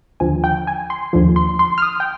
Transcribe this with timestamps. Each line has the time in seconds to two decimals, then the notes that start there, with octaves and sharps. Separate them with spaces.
0.20 D#2 D3 F3 G#5
0.44 G5
0.67 G#5
0.90 C6
1.13 D#2 D3 F3
1.36 C6
1.59 C6
1.78 F6
1.82 D#6
2.00 G5